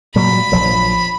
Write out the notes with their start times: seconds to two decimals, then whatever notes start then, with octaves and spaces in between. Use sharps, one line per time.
0.15 A#2 F#3 G3 B5
0.52 A#1 F3 F#3